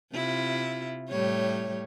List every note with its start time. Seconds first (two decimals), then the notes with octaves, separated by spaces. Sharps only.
0.12 C3 E4 F4
1.09 A2 G3 C#5